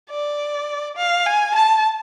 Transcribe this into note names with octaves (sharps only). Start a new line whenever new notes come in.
D5
F5
G#5
A5